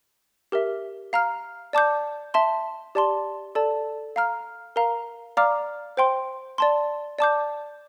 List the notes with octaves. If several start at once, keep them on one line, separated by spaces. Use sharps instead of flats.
G4 A#4 E5
F5 A#5 F6
D5 A5 D6 G6
E5 A5 C6
G4 D5 A5 C6
A4 D5 A5
F5 A#5 F6
A#4 F5 A#5
D5 F5 A#5 D6 F6
C5 G5 C6
D5 A5 C6
D5 A5 D6 G6